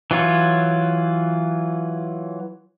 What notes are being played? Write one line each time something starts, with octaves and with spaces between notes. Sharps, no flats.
E3 F#3 F4 C#5